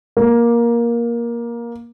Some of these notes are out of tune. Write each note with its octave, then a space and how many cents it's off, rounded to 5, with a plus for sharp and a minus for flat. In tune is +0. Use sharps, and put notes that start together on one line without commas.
A#3 +15